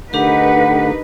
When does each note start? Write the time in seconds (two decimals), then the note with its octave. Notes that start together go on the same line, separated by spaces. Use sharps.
0.13 D3 A3 D4 D#4 G4 A#4 B4 F#5